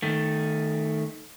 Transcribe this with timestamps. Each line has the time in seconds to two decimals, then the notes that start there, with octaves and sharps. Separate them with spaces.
0.02 D#3 A3